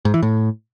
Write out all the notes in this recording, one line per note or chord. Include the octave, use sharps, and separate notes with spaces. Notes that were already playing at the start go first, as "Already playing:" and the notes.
G#2
E3
A2